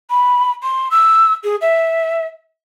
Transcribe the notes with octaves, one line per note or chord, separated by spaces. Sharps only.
B5
C6
E6
G#4
E5